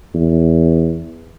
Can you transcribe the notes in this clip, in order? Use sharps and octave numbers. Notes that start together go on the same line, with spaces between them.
E2